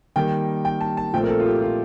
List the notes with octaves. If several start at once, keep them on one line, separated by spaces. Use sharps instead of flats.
D#3 G3 A#3 G5
G5
A5
A5
A#2 F3 A3 C4 G5
A#4
A4
F4
G4
G4
F4